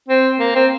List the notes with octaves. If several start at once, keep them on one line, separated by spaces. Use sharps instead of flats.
C4
A#3
C4